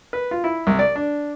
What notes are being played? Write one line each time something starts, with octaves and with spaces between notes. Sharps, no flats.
B4
F4
E4
C2
D5
D4